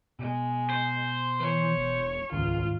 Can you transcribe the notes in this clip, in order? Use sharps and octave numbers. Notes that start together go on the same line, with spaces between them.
B2 G#3
C5
E3 C#5
E1
D#1 C#2 G#2 D#3 F4